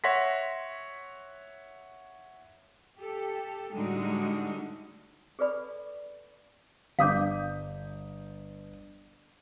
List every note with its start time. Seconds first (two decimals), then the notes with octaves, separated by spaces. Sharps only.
0.04 C#5 E5 F#5 C6 A#6 B6
2.98 G4 A4
3.73 A2 D3 G3 G#3 D#4 F#4
5.39 G#4 A4 B4 D5 B5
6.99 G1 F5 D6 D#6 G6